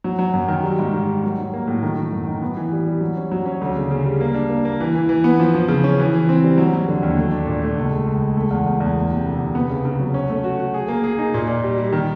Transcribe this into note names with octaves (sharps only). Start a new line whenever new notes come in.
F#3
F#3
F#2
D#3
G3
G#2
D#3
G3
F#3
F#3
A#3
A2
D#3
D#3
F#2
D#3
B3
E3
G3
G3
F#3
C#4
F#3
C#4
D2
C#3
C#3
G3
A#3
D4
A#3
A#3
E3
E3
E3
B3
F3
F3
C#3
C#4
E3
E3
C4
G3
F#3
F#3
D3
D#2
A3
D4
A#2
A3
C#2
G#3
C#2
G#3
A3
E2
E2
E2
A#3
C3
D2
C3
B3
C#3
C#3
F#3
C#4
A3
F#4
F#4
G#4
A#3
G#4
D#4
A#2
A#2
G3
G3
D#3